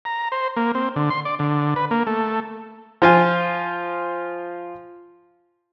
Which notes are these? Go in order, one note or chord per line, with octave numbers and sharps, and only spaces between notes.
A#5
C5
A#3
C4
D3
C6
D5
D3
B4
A#3
A3
F3 F4 G#5